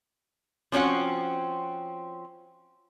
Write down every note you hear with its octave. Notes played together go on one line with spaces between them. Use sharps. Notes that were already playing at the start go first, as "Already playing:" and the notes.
F3 C4 C#4 F#4 F#5